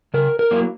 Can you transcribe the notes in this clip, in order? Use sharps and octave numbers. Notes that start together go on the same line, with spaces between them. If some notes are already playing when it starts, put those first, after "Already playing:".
C#3 A#4
A#4
F#3 A#3 E4